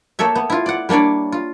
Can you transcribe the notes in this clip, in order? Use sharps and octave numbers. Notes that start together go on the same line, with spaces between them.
A3 A#3 A4 C#5 E5
B3
E4 F4
D5 F#5
G3 A#3 D4 C#5 D5
F4